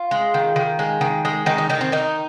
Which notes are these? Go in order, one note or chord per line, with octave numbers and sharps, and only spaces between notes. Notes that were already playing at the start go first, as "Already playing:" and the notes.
Already playing: F4
G#3
D#3
D#3
G#3
D#3
G#3
D#3 D#4
D#4
D#3 D#4
C4
D#3 D#4